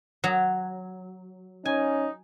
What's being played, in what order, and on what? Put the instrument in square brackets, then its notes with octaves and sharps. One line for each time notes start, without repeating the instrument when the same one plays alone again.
[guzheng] F#3
[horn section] C#4 D#4 [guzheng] G#5